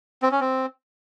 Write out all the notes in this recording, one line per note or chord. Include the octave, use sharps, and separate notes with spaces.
C4
C#4
C4